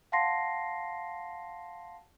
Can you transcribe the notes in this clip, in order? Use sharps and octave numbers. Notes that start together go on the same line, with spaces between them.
F5 F#5 A5 C6 A#6 C7